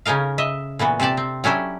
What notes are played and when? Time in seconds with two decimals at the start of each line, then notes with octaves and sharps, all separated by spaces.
0.06 C#3 C#4 D#4 A#4 F5
0.38 D#5 E5
0.79 A#2 E3 B3 F#4
1.00 C3 D4 G4 D5 A5
1.17 C4
1.44 F#3 C#4 D4 E4 G4